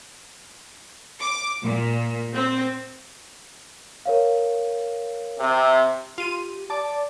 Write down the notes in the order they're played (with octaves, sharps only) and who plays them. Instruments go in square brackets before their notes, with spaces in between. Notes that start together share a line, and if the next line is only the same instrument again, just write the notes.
[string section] D6
A#2
C4
[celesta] A#4 C#5 F5
[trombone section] C3
[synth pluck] F4 D#7 [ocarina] G4
[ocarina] D5 [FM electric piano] A5 D6